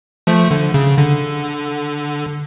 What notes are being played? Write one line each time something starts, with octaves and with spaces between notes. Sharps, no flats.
F3 A3
D3
C#3
D3